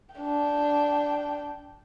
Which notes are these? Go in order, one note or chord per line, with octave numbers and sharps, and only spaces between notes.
D4 G5